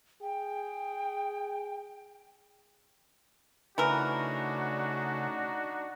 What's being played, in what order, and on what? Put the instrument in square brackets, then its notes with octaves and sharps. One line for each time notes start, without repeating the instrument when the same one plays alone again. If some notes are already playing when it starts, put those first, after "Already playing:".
[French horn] G#4 [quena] G5
[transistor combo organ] C#3 A3 [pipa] E3 A#4 [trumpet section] D4 D#4 F#4